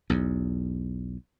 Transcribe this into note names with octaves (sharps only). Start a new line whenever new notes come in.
B1 E2